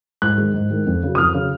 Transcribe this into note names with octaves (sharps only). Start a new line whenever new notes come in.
G#2 F#6
D#3 G#3
G#2
D#3 G#3
F2
C#3 F#3
D#6
F2 F6
C#3 F#3